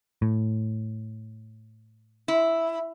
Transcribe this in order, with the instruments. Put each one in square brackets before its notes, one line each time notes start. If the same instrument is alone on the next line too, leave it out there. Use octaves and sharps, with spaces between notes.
[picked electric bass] A2
[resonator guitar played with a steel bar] E4